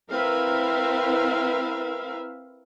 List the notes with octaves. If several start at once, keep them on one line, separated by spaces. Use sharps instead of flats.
C4 E4 A#4 B4 E5 F5